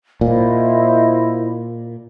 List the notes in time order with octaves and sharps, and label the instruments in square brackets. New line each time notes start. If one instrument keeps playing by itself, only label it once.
[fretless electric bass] A#2 [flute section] E4 C5 D#5